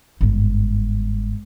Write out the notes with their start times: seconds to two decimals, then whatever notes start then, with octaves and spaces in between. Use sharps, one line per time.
0.21 G1 G#2